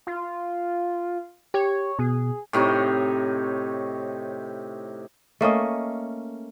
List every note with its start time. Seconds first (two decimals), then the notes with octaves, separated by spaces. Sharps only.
0.07 F4
1.54 G4 C#5
1.99 B2 G#4
2.53 A2 C3 D#4 C#5
5.41 A3 A#3 C#4 D#5